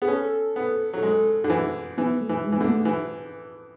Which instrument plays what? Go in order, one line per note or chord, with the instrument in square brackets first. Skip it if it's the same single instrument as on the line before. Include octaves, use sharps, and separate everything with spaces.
[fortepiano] B3 [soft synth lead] G#4
[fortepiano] C#4 [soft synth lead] A4
[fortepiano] B3
F#3
G#3
D3
E3
[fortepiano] E3 [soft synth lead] B3
[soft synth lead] A3
[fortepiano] E3
[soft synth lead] G#3
[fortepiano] E3
[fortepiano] D3 [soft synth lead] B3
[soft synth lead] A3
[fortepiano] E3